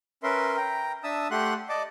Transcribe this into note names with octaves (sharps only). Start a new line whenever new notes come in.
C#4 A#4 B4 E5 C6
G5 A#5
D4 E5 A5 D#6 E6
A3 G4 F#5 C6 F#6
D5 D#5 A5 D6